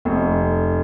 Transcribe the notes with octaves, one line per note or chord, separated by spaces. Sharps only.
F1